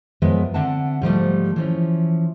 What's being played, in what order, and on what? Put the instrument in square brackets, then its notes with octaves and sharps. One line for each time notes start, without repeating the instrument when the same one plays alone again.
[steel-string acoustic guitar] F#2 F3 G#3 B3 B4 E5
D3 C4 D4 E5 F#5 A5
G#2 F3 G3 A3
E3 F3 C#4